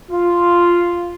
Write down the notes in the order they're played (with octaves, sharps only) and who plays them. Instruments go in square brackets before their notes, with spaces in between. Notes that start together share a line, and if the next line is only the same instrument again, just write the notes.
[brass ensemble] F4